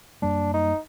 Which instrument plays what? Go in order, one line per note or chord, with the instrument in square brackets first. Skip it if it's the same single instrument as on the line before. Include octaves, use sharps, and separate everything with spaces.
[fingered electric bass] F#2 G3 A#3 [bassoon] D4
[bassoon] D#4